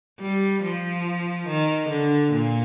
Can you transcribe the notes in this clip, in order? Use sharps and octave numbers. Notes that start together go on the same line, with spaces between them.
G3
F3
D#3
D3
A#2